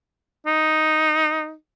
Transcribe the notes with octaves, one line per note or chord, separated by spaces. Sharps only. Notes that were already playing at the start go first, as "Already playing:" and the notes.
D#4